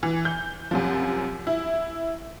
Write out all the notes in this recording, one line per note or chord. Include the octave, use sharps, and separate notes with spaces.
E3
G6
F#2 C3 F3
E4